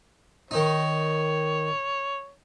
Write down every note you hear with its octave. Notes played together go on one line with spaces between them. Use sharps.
D#3 D#4 C#5